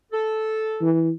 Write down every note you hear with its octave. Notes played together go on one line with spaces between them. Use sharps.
A4
E3